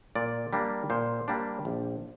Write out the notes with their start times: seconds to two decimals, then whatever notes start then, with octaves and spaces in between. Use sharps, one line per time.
0.15 A#2 D5
0.53 G3 A#3 D4
0.90 A#2 C5
1.28 G3 A#3 D4
1.65 A#1